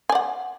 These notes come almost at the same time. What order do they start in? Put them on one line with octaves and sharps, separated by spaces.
G#5 D5 F#5